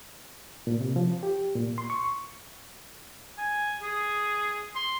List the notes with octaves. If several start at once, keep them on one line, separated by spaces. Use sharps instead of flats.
A#2
C3
F3
G4
A#2
C6
C#6
G#5
G#4
C6